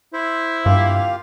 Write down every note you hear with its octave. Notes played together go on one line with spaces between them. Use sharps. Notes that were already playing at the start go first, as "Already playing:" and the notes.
E4 C5
G2 A#3 F4 G4 F5